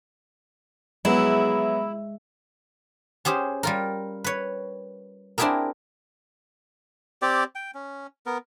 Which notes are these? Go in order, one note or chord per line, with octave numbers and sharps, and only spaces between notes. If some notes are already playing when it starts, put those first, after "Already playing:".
F#3 G#3 B3 E4
C#4 G4 G#4 C5
G3 F4 A#4
B4 C#5
C4 D4 E4 G4 G#4 A#4
C4 G4 D5
G5
C#4
B3 A#4